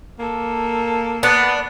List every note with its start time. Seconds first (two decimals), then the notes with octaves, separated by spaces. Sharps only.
0.19 A#3 A4
1.23 B3 D4